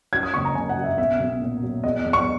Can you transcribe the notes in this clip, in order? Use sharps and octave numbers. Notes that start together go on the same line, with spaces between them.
F#2 G#6
D#6
F#1 C#6
A#5
F#1 G#5
F#5
F#2
E5
B1 E5
B1
A#2
F#3
E2 D#5
E2
C#6